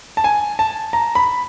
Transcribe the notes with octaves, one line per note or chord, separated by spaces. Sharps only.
A5
G#5
A5
A#5
B5